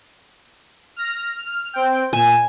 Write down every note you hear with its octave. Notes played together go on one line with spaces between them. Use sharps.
F6 A#6
F6
C4 G5
A#2 G#5 E7